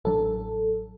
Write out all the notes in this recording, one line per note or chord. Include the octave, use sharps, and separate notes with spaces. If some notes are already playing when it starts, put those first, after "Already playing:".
A1 F#3 D4 A4